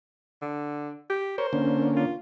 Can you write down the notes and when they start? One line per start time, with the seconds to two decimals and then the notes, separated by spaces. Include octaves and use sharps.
0.42 D3
1.10 G4
1.38 A#4 C5 C#5
1.53 D3 A#3 C#4
1.97 F4